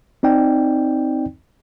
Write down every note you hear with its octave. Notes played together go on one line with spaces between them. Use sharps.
C4 D#4 D5 G5